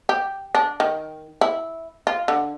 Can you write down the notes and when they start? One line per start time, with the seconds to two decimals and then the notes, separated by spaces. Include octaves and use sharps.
0.09 G4
0.55 D4
0.80 D#3
1.41 E4
2.07 F4
2.28 D3